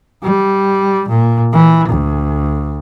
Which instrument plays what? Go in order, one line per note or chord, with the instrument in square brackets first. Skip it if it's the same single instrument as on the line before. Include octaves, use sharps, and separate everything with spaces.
[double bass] G3
A#2
E3
D2